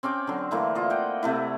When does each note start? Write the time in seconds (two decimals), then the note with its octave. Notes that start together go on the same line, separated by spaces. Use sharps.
0.03 C4 C#4 G5 D6
0.27 D3 F#3
0.51 D3 E3 A3 A#3
0.75 F4 D#5
0.90 F#5 G5
1.23 C3 A3 E4